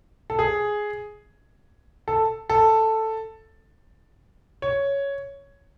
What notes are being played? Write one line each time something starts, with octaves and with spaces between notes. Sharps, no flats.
A4
G#4
A4
A4
C#5